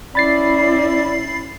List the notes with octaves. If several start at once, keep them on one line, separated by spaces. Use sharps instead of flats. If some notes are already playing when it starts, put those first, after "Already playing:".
C#4 E4 D5 B5 A6 C7